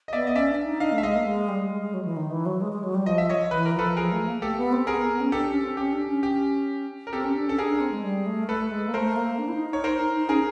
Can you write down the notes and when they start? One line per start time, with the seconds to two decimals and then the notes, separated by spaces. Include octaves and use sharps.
0.08 D#5
0.13 B3 D5 E5
0.27 D#5
0.35 C#4 D5 E5
0.51 D4
0.65 D#4
0.80 D4 D#5 F5
0.92 A3
0.98 E5
1.03 G#3 D#5 F5
1.15 A#3
1.26 G#3
1.49 G3
1.71 G#3
1.82 G#3
1.94 F#3
2.05 E3
2.17 D#3
2.31 E3
2.46 F#3
2.61 G#3
2.72 G#3
2.83 F#3
2.95 G3
3.06 F3 D#5
3.18 E5
3.29 C#5 D#5
3.51 E3 B4
3.65 A#4
3.74 F3 A4 B4
3.97 F3 G#4 A#4
4.12 A3
4.27 A#3
4.42 A3 G4 A4
4.57 B3
4.73 C4
4.87 B3 G#4 A#4
5.10 B3
5.21 C#4
5.32 D4 G4 A4
5.48 C#4
5.63 C4
5.77 C#4 G4
5.93 D4
6.08 C#4
6.23 G4
7.07 A#4
7.13 C4 G4 A4
7.24 C#4
7.36 D4
7.47 C#4 A4
7.58 D4 G#4 A#4
7.70 D4
7.81 C4
7.91 G#3
8.03 G3
8.26 A3
8.48 A3 A4 B4
8.71 G#3
8.88 A#3
8.94 A3 A#4 C5
9.16 A#3
9.39 D4
9.48 E4
9.54 D#4
9.69 D#4 C#5
9.84 A#4 C5
10.00 D#4
10.14 D#4
10.29 C#4 G#4 A#4